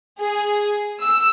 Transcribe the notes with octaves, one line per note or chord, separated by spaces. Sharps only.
G#4
E6